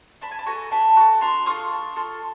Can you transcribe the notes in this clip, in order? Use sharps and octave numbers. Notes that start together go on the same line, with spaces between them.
D4 A5 B5
G#5
A5
F#4 A4 G#5 A#5
D4 A5 B5
F#4 A4
D4 A#5 C6
F4 A4 C#6 D#6
D4
F4 A4